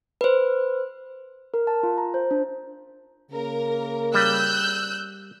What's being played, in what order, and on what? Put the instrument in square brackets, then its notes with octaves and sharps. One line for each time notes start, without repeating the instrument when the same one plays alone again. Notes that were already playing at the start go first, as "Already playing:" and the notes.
[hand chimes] B4 C5
[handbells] A#4
A5
F4
A#5
C5
D4
[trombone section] C#3 A#3 [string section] A#4
[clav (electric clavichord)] G3 [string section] E6 F#6 G6